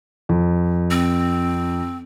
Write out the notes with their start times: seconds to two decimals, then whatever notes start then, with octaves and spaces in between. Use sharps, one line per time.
0.29 F2
0.91 C4